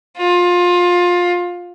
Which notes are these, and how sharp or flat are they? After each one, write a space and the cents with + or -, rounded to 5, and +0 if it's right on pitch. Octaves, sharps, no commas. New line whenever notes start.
F4 +20